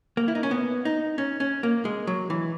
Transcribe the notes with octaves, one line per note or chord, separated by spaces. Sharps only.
A#3
E4
D#4
C#4
B3
D#4
C#4
C#4
A#3
G#3
F#3
E3